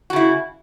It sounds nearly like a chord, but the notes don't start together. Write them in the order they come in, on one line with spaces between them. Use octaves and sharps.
F#4 C#3 E4